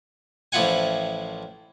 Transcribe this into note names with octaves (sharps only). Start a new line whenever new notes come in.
A1 F3 E4 F4 F#5 G#5